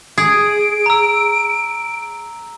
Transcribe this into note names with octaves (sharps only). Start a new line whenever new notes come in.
G#4 D7
A#5 E6